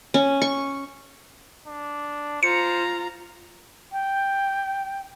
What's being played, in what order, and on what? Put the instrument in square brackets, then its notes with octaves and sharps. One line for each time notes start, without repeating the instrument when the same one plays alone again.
[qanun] C#4
C#6
[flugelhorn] D4
[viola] F4 A#5 [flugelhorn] C5 [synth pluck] C#7
[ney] G5